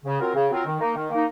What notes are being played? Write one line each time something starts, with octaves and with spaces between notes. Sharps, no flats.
C#3
F#3 C4 F4 A#4
C#3
F#3 C4 F4 A#4
D#3
A#3 D#4
D#3
A#3 D#4